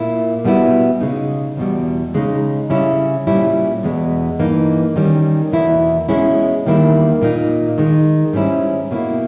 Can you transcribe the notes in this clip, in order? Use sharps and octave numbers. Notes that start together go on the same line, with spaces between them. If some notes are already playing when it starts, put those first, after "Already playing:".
Already playing: A#2 A#3 E4
B2 G3 B3 E4
C#3 G#3 D#4
E2 B2 G3
C#3 G#3 D#4
C#3 G3 C#4 E4
A#2 G3 C#4 E4
E2 B2 G#3
G2 E3 A#3 D#4
D#3 G3 C#4
E2 B2 A#3 E4
B2 G#3 C#4 E4
E2 D#3 G3 A#3 E4
A#2 A#3 D#4
D#3 G#3 D#4
G#2 G3 C#4 E4
B2 A#3 E4